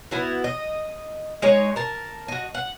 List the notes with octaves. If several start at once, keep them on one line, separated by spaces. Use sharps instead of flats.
B3 E4 F#4
D#5
G#3 D#4 C#5
A#4 A5
F#4 D#5
F#5